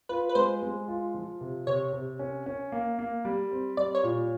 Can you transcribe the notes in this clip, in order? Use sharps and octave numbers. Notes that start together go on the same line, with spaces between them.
F4 B4
B4
G#3 C5
G#3
F4
F3
C3
C3 C#5
C3
C#4
C#4
A#3
A#3
G3
C4
G3 D5
C#5
A#2